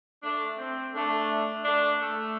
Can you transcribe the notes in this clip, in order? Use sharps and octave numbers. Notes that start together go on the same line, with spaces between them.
A3 D4
C4
A3 D4
A3 D4
A3